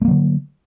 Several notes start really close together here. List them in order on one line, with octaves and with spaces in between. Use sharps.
A3 A#3 F#3 D3